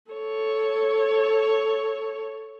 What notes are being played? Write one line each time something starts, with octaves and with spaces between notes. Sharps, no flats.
A4 C#5